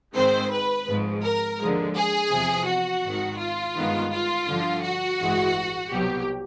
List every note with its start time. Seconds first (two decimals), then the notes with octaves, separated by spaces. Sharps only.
0.16 G#2 D#3 G#3 C4 C5
0.52 B4
0.87 G#1 G#2 F3 G#3
1.23 A#4
1.60 D#2 D3 F3 G#3
1.96 G#4
2.31 E2 C3 F3
2.67 F#4
3.04 G#1 G#2 D#3
3.40 F4
3.76 G1 G2 D#3 G#3 B3
4.11 F4
4.47 G2 D3 F3
4.83 F#4
5.20 A1 G2 E3 G#3
5.91 C2 B2 F#3 G4